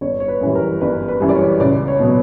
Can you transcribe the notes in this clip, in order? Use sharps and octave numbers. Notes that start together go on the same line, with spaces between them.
G1 C#5
C#5
B4
F#2 E3 G3
A#4
G1 B4
B4
F#2 E3 G3
D5
C#5
C#2 D5
C#5
B2 F#3 B3